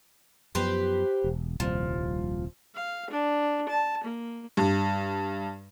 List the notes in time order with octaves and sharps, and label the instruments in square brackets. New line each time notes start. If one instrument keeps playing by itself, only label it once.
[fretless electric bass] F#2 F3 B3 [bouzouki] G4 B4 C5
[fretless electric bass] E1
[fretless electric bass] D#1 C2 C3 [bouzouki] F3
[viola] F5
D4
A5
A#3
[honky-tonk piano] G2